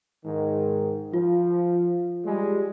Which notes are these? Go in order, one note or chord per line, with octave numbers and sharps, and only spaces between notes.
G#2 D#3
F3 F4
G3 G#3